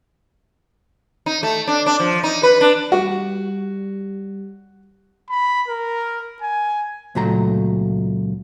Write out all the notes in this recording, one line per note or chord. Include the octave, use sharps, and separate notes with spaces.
D#4
A3
D4
D4
F3
D#4
B4
D4
G3 F#4
B5
A#4
G#5
C#2 A#2 F#3 A3 A#5